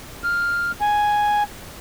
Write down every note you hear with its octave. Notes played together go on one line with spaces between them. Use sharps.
F6
G#5